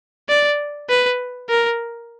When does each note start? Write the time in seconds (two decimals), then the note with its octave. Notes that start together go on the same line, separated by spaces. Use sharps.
0.29 D5
0.90 B4
1.50 A#4